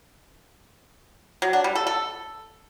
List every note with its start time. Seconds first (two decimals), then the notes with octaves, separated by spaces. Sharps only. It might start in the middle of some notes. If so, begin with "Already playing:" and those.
1.42 F#3
1.53 D4
1.64 G3
1.75 A4
1.87 A4